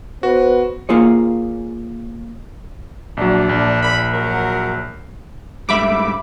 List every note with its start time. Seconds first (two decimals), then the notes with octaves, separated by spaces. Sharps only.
0.23 B3 F#4 B4 C5
0.89 A#3 F4 G#4 C#5
3.17 A#1 F#3 D4
3.49 A#1
3.82 A#2 B5
4.12 F#3 A#4
5.69 G#2 G3 A3 E5 B5 D6